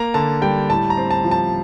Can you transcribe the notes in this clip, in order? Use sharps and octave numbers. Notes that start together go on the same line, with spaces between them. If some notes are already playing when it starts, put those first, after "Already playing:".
Already playing: A#3 A#5
D3 A5
G3 G5
A2 A5
A#5
C4
A5
F3
A5